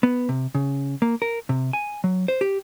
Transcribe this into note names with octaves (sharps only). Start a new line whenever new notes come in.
B3
C3
C#3
A#3
A#4
C3
G#5
F#3
C5
G4